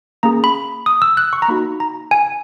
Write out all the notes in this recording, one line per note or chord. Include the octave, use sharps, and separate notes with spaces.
A#3 C#4 G#4 A#5
B5
D#6
E6
F#6
C#6
A#5
A#3 D#4 F#4 B5
A#5
G#5